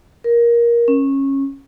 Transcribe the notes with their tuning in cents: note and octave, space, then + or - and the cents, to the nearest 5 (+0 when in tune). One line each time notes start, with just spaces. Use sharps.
A#4 +15
C#4 -20